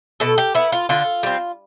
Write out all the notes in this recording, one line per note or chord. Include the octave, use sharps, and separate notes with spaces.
B2 A4
G4
B3 E4
F4
D3 F4
G3 C4